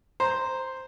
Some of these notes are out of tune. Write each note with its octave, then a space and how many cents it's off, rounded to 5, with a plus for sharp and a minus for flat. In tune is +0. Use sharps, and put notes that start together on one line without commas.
C5 +0 A#5 +0